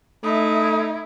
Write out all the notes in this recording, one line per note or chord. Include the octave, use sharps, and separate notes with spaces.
A3 D#4 E4 D#6